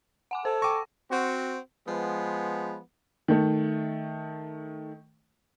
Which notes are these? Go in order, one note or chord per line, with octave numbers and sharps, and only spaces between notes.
F#5 G#5 D6
A4 C5
G5 C#6 D6 A#6
C4 F#4
F3 G#3 B3
D#3 A3